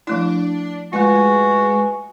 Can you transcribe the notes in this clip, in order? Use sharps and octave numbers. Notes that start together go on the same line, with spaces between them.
F3 A3 D4 E4
G#3 A3 F4 F#4 B4 G#5